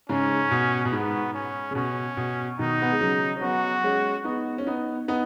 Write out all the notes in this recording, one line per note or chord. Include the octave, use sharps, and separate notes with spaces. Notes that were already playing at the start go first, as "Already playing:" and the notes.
G#2 C#3 C#4
B2
B2
G#2 B3
C#4
C#3
B2 C#4
B2
B2 D#3 D#4
B3
G#3
C#3 F#3
C#4
F#3 B3 F#4
G#3 C#4
B3 D#4
C#4
B3 D#4
B3 D#4